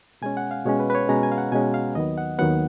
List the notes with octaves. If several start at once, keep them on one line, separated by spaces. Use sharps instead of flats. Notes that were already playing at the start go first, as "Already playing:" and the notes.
B2 G#3 C#4 G#5
F#5
F5
B2 G#3 C#4 C#5
B4
B4
C#5
B2 G#3 C#4 A#5
G#5
F5
F#5
B2 G#3 C#4 G#5
F5
D#2 D#3 F#3 B3 D#5
F#5
D#2 D#3 F#3 B3 F#5